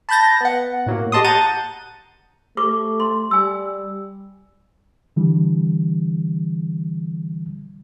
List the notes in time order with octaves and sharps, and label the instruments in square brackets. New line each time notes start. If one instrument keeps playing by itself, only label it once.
[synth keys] A5 B5 F#6 G6 A6 A#6
B3 F#5
A2 F#3 A#3
G4 D#5 A5 C6 D#6
F#5 A5 A#5 G6 A6 D#7
[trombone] A3 [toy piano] G4 C#6 D6
[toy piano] C6
[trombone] G3 [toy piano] G#5 E6
[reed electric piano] D3 E3 G3